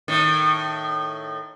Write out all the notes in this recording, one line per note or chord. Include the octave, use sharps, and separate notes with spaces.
A2 D#3